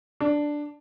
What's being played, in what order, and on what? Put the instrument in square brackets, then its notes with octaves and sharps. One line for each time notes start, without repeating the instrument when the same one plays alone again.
[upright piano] D4